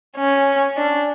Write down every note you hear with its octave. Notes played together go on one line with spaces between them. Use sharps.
C#4
D4